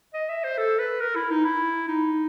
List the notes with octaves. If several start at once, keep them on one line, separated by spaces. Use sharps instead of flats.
D#5
E5
C5
A4
B4
A#4
E4
D#4
E4
D#4